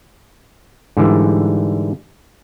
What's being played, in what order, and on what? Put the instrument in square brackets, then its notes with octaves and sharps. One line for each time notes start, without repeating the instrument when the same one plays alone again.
[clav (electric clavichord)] G#2 D3 E3 G3